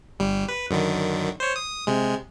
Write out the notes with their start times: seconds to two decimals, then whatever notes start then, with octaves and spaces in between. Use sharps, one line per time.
0.19 G1 G3
0.48 B4
0.71 F#2 D3 D#3
1.40 C5 C#5
1.56 D#6
1.87 C3 G#3